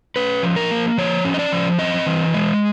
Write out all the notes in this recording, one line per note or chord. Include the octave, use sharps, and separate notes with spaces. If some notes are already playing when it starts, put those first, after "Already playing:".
C#4 B4
F3
A#4
A#3
F3 C#5
C#4
D#5
D5
F3
C4 D#5
E3
G#3